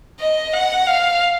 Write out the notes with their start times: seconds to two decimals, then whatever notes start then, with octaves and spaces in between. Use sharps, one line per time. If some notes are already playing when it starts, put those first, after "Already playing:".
0.20 D#5
0.53 F#5
0.86 F5